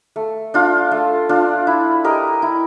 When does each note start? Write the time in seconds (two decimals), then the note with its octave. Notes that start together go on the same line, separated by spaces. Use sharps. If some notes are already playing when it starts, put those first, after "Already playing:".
0.16 A3
0.54 D4 F4
0.91 A3
1.29 D4 F4
1.67 E4
2.04 G4 A#4 D#5
2.42 E4